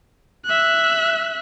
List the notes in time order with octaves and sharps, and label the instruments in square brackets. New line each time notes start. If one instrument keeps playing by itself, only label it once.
[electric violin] E5 F#6